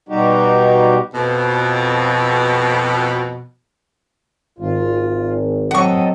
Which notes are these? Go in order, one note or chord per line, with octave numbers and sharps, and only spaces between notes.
B2 G3 D#4 F#4 G4
F2 B2
G#1 F4
F#3 C4 A4 D#5 F#5 C#6